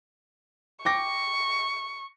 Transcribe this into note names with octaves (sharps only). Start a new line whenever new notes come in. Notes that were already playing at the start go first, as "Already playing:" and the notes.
G5 C#6 D6 A#6